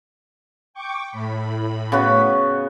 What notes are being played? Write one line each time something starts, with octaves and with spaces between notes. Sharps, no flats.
G5 C#6 D6
A2 B5
C#3 B3 F#4